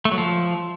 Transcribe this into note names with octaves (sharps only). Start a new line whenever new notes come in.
A3
F#3
F3